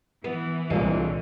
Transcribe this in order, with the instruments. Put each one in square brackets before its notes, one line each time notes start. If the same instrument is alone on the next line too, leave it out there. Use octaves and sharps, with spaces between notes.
[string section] E3 [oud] B3
[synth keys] C2 A#2 [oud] D3 G#3 C#4